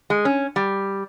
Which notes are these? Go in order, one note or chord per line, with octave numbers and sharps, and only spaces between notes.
G#3
C#4
G3